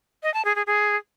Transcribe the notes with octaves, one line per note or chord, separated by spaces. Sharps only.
D#5
A5
G#4
G#4
G#4